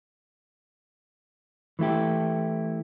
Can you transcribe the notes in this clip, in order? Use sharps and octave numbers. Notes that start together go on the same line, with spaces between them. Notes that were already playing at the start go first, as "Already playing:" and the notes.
E3 A3 E4 G4